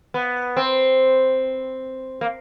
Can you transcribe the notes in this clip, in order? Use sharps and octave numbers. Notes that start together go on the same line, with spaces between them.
B3
C4
A#3